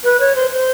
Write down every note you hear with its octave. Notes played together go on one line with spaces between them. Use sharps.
B4
C#5
C5
C5